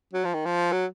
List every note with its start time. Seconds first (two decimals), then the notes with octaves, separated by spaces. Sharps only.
0.13 F#3
0.25 F3
0.34 D#3
0.45 F3
0.72 F#3